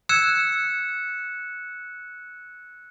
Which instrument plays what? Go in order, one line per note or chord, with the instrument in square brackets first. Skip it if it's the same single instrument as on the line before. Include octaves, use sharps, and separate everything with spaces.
[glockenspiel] E6 F#6 G#6 C#7 E7